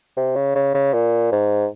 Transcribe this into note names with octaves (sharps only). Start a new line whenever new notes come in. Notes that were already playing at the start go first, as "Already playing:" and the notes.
C3
C#3
C#3
C#3
A#2
G#2